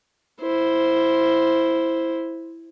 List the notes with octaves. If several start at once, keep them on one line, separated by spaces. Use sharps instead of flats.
E4 C5